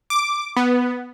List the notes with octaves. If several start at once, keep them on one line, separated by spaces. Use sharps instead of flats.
D6
B3